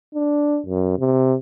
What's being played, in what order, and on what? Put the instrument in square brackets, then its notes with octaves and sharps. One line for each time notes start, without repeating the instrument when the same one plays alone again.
[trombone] D4
F#2
C3